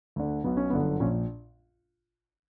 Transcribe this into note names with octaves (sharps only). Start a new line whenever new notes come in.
D2 D3
B1 B2 B3
C#4
G1 F#2 D3 B3
A#1 A#2 C#4